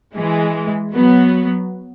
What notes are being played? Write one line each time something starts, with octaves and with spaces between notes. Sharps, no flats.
E3 G#3
F#3 B3